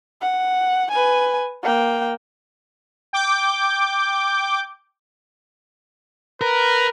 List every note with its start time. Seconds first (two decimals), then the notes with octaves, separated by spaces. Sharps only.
0.21 F#5
0.92 B4 G#5
1.63 A#3 G5
3.13 G5 D6 G6
6.41 A#4 B4